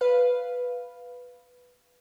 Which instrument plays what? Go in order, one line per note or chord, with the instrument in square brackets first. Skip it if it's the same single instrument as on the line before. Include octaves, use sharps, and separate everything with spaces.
[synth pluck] B4 F5